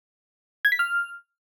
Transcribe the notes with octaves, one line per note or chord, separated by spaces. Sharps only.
G#6
B6
F6